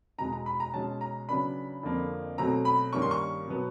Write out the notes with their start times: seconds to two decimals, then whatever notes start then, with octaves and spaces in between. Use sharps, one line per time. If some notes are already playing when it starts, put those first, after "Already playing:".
0.18 E2 B2 G#3 A#5
0.33 A#5
0.46 B5
0.60 A#5
0.74 B2 G#3 C#4 A5
1.01 A#5
1.29 C#3 F#3 B3 D4 B5
1.83 F2 D3 F3 A#3
2.38 B2 F#3 A3 C4 A#5
2.65 B5
2.93 G2 D#3 G3 A#3 C#4 C#6
3.02 C6
3.11 C#6
3.48 B2 F#3 B3